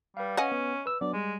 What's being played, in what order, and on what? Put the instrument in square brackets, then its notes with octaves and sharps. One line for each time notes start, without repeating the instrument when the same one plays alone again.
[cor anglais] G3 [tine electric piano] B4 F5
[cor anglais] C#4 [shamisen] D#5 F#5 G#5
[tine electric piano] B3
B4 E6
[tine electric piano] F#3 B3 D4 [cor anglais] D5
[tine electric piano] G3 [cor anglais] G#3